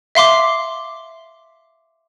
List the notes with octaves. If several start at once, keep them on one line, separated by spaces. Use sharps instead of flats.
E5 F5 C6 D6